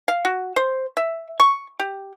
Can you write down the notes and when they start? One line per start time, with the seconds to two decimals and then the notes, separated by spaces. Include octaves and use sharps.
0.08 F5
0.25 F#4
0.56 C5
0.97 E5
1.40 C#6
1.80 G4